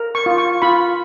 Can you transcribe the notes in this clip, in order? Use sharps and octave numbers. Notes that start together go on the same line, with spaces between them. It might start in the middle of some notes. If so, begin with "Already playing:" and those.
Already playing: A#4
C#6
F4
C#6
F4 B5